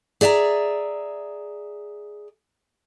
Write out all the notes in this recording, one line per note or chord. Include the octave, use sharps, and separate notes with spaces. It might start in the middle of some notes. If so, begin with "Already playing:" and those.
G#4 D5 E5 F5 A#5